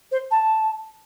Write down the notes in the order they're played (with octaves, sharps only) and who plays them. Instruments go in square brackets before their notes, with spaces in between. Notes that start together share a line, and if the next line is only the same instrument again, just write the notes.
[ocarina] C5
A5